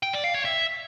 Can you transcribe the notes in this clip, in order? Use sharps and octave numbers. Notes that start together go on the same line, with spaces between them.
G5
D5
F5
C#5
E5